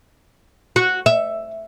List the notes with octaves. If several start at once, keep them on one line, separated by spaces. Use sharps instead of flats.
F#4
E5